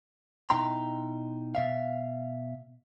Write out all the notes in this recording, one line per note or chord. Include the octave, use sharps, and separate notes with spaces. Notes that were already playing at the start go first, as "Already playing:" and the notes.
B2 D#4 E4 G5 A#5 C6
B2 E5 F5